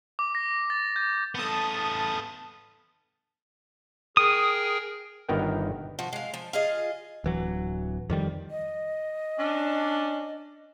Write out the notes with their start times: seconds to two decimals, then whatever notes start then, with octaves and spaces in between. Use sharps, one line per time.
0.19 D6
0.35 A#6
0.70 A6
0.96 G6
1.35 B3 A4 A5 D#6
4.17 G#4 A#4 G5 D#6
5.29 G1 D#3 B3 A#4 F#5 G5
5.99 F3 F#4
6.13 G#3 F5
6.34 F3
6.53 F4 G#4 D#5
7.24 D1 E3 F#3
8.10 F2 D#3 G3
8.51 D#5
9.39 C#4 D4